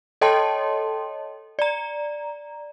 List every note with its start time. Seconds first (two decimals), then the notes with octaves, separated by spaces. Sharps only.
0.21 A4 C#5 D#5 G5 A5 C6
1.59 D5 A#5